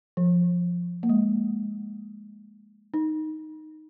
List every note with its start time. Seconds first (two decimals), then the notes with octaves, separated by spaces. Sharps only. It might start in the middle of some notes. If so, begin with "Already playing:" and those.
0.17 F3
1.03 A#3
1.09 G#3
2.94 D#4